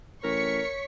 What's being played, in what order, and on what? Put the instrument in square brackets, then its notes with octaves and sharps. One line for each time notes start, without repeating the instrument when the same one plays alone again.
[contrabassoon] A1 [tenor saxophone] A#4 [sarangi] C#5 [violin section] C#6 B6 C#7